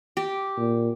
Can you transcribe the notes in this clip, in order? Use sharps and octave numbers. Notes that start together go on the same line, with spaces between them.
G4
A#2